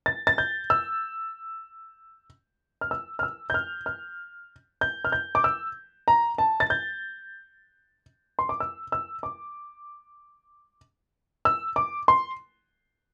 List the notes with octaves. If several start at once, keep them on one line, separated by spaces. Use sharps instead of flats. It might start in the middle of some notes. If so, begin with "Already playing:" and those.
A6
A6
G6
E6
F6
E6
F6
E6
G6
F6
F6
G6
F6
G6
D6
E6
A#5
A5
A6
G6
C6
D6
E6
E6
D6
E6
D6
C6